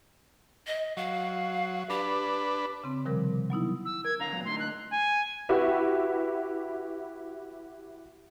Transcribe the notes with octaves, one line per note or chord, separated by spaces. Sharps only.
D#5
F#3 F5
D4 G4 B4
C#3 C4
C3 D#3 F3 G3 A#4
F#3 B3 D#4 E4
E6
A#4 G#6
D3 F5 A#5
A#2 F#3
A2 D3 D#4 C6
F#6
G#5
E4 F#4 G4 B4 E5